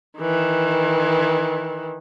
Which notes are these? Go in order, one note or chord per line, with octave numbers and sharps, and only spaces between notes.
D#3 E3